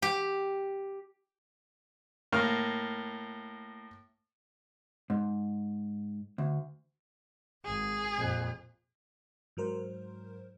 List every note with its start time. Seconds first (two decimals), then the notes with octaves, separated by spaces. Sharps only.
0.02 G4
2.32 A2 A#3 F6
5.10 G#2
6.38 D2
7.65 G#1 G#4
8.14 F2 A#2
9.57 G#2 F#3 A#4 C5